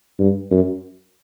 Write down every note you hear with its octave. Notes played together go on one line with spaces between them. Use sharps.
G2
F#2